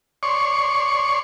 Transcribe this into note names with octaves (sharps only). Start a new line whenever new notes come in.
C#5 D5 C6 C#6